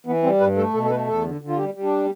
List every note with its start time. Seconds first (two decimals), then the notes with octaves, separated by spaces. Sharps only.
0.06 E3 B3
0.23 G3 C4
0.40 G2 B4
0.57 A3 A4
0.74 B2 A4
0.85 A4
0.90 A3 B4
1.07 E2 A4
1.24 D3
1.41 D3
1.48 F4
1.57 G3 G4
1.74 G3
1.83 D4